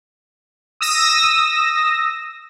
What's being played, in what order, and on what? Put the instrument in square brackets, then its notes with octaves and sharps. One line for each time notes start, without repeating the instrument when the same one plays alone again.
[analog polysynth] D#6 E6 A#6